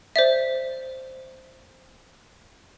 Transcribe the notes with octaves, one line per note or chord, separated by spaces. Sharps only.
C5 D5 E5